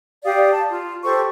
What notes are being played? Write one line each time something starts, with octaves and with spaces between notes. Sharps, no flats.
G4 D5 F5 D#6
A5
F4
G4 A4 C5 C#6